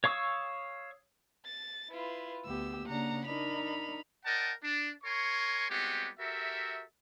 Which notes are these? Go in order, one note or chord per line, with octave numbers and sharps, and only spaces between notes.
C#5 F5 C#6 D#6 E6
A6
E4 F4 B4
D2 B3 G4 E6
C#3 A#3 D4 F#5 A#5
D4 D#4 A#4 B5 F7
A#4 D5 D#5 F#5 G5 A5
D4
A#4 C#5 G#5 C6 C#6
G3 G#3 B3 C4 F#4 G4
F#4 G4 A4 A#4 E5